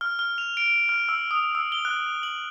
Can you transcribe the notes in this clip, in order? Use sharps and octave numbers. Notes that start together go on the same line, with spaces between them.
F6
F6
F7
D7
F6
E6
D#6
E6
G7
F#6
F#7